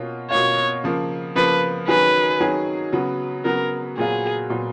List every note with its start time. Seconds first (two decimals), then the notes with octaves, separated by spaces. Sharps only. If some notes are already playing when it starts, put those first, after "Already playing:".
Already playing: B2 A#3 C#4 F4
0.30 B2 A#3 C#4 F4 C#5
0.84 C#3 F3 A#3
1.35 C#3 F3 A#3 B4
1.88 D#3 F#3 C#4 G#4 B4
2.40 D#3 F#3 C#4 G#4
2.93 C#3 F#3 B3
3.45 C#3 F#3 B3 A#4
3.98 A#2 F#3 B3 F4 G#4
4.50 A#2 F#3 B3 F4